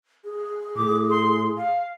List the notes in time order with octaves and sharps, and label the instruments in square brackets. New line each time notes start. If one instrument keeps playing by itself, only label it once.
[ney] G#4
[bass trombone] A2 [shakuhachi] D6
[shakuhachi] C6
F5